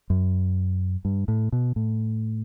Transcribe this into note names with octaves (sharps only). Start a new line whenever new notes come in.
F#2
G2
A2
B2
A2